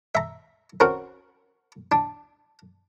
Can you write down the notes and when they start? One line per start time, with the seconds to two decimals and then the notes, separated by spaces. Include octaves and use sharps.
0.15 E5 A#5
0.80 C4 C#4 F#4 A#4
1.92 D4